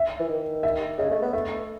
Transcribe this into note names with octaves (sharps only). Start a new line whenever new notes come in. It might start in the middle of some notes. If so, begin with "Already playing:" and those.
Already playing: E5
E3
D#3
E5
C#3 D#5
A3
B3
A3 E5